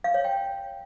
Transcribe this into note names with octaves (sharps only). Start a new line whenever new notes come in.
F5
C#5
G5